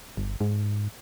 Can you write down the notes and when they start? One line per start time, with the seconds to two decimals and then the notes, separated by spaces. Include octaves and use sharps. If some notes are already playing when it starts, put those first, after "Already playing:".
0.17 G1
0.41 G#2